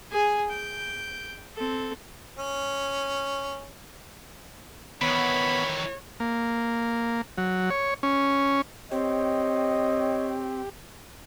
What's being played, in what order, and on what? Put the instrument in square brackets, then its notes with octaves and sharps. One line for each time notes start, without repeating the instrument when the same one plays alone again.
[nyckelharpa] G#4 G#5
G5
C4 A4
[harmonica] C#4
[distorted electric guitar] D#3 E3 [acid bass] B3 [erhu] C#5 [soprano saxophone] B5
[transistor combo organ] A#3
F#3
C#5
C#4
[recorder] C4 [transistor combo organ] G4 [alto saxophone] C#5 [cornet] D#5